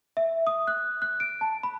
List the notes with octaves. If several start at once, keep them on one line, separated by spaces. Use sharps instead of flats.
E5
D#6
F#6
F#6
D7
A5
B5